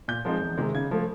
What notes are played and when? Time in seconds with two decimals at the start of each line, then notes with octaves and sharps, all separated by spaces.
0.08 A#2 G6
0.25 F3 G#3 C4 D#4
0.41 E2
0.58 C3 D#3 G#3
0.75 C#3 G#6
0.91 F3 A3